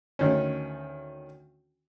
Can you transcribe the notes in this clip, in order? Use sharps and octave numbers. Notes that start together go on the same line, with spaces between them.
D2 D#3 C#4